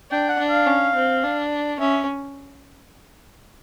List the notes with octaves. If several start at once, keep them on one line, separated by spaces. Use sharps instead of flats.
D4 G5
F#5
D4
F5
C#4
C4
D4
C#4 E5